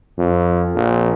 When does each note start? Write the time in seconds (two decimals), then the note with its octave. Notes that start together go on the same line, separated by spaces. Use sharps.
0.18 F2
0.76 A#1